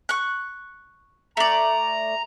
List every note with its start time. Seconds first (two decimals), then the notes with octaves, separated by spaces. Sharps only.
0.09 C#6 F#6
1.37 A3 D5 A#5